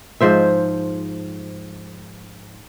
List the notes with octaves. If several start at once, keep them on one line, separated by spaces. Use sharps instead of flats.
G#2 F3 C5 E5